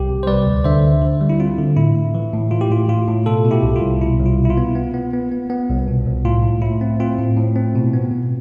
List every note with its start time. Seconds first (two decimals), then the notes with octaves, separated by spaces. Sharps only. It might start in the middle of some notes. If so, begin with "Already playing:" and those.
Already playing: C2 G4
0.09 C3
0.23 C5
0.27 G3 B4 D5
0.47 D2
0.64 D3 C5 E5
0.83 D2
1.02 D3
1.21 G3
1.30 E4
1.40 C4 F4
1.58 D3
1.77 A2 E4
1.95 A2
2.15 E3
2.33 A2
2.51 A2 F4
2.61 G4
2.71 A2 F4
2.89 A2 F4
3.08 A2
3.26 B2 F4 A4
3.45 B2
3.51 E4 G4
3.63 C2
3.76 F4
3.82 C2
4.01 B2 E4
4.19 C2
4.26 F4
4.39 B2
4.45 E4
4.50 F4
4.57 B3
4.75 B3
4.94 B3
5.13 B3
5.32 B3
5.50 B3
5.69 C2
5.88 B2
6.07 C2
6.25 A2 F4
6.43 A2
6.62 A2 E4
6.81 C4
7.00 C4 F4
7.19 A2
7.37 A2
7.56 C4
7.75 B2
7.93 B3
8.11 B2